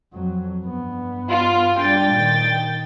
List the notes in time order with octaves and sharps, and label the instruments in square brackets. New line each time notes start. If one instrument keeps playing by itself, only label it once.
[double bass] F2 F#3
G2 B3
[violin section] F4
[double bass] G3 D4 [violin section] G5 A6
[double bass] A#2 D#3